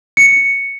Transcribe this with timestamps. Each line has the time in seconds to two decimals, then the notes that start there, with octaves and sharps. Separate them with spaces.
0.17 C#7